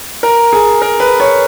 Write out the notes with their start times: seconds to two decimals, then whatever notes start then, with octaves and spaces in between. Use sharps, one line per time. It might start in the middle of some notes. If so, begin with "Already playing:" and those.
0.23 A#4
0.53 G#4
0.82 A#4
1.00 B4
1.20 C#5